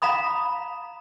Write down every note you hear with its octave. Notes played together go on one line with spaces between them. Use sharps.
F5 A#5 B5 D#6